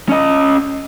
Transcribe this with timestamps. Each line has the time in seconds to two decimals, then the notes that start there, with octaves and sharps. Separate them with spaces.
0.09 C#4 D#5